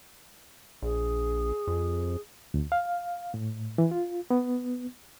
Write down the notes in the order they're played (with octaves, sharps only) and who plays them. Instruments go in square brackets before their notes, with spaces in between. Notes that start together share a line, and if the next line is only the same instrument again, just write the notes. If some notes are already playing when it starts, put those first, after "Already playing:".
[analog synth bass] A#1 [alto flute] G#4
[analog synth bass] F2
[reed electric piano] D2
F5
A2
E3
F4
B3